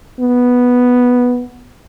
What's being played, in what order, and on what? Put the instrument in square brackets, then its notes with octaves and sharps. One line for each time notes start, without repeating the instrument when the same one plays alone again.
[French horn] B3